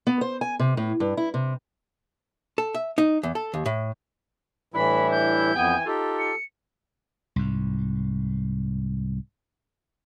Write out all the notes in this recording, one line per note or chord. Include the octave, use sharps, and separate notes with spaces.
B3
C5
G#5
C3
A2
G2
E4
C3
A4
E5
D#4
E2
A4
D#2
A2
A2 E3 G3 D4 E4 B5
G6
F2 E3 B3 G5 G#5
D#4 F4 G4 A4
C#7
C2 G#2